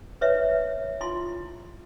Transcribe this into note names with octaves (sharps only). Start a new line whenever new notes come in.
B4 C#5 E5
E4 F4 C6